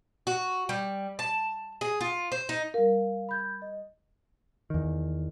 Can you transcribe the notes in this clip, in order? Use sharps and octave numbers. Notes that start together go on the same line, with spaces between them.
F#4
G3
A5
G#4
F4
C5
D#4
G3 A#4 F5
B5 G6 G#6
D#5
E2 D#3